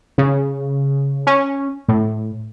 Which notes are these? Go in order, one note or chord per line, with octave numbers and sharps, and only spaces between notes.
C#3
C#4
A2